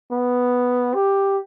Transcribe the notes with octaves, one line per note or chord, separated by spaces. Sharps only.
B3
G4